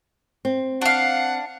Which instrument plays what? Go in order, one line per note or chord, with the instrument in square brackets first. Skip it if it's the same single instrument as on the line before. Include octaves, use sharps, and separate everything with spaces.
[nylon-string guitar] C4
[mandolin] D4 F5 [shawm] F#5